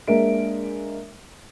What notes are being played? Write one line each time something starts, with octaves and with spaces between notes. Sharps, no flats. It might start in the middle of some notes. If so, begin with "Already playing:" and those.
G#3 A#3 D4 A#4 E5 D7